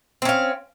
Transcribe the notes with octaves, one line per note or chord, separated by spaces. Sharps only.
C4 C#4 F5